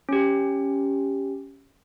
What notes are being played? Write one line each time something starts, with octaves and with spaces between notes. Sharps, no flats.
C#4 G4